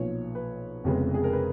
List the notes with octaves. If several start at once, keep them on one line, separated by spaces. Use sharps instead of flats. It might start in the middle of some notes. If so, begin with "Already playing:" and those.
Already playing: B1 A#2 F3 B3 C#5
B4
F1 F2 C#3 G#3 B3
G#4
A#4
B4